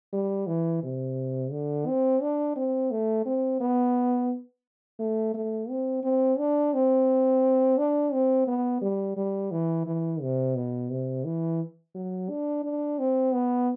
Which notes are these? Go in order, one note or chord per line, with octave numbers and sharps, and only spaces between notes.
G3
E3
C3
D3
C4
D4
C4
A3
C4
B3
A3
A3
C4
C4
D4
C4
D4
C4
B3
G3
G3
E3
E3
C3
B2
C3
E3
F#3
D4
D4
C4
B3